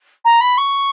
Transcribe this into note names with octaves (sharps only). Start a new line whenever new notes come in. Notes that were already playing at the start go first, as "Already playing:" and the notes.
A#5
B5
C#6